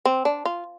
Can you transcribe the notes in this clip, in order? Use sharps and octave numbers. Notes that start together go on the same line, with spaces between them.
C4
D4
F4